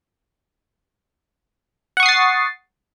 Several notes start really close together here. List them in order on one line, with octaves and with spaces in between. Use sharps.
F#5 C#6 D#6 C7 A6